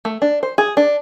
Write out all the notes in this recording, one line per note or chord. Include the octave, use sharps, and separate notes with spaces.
A3
D4
C5
G#4
D4